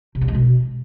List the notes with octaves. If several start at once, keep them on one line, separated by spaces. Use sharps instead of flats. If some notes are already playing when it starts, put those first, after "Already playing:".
C3
G2
G#3
B2